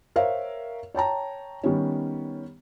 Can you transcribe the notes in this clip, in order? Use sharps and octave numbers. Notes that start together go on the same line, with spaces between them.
A#4 C5 C#5 E5 F5
C#5 G5 A5 A#5
D#3 G3 B3 C#4